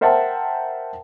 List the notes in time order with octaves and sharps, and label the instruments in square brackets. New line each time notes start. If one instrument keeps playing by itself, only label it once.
[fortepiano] A#4 C5 E5 F#5 G5 A5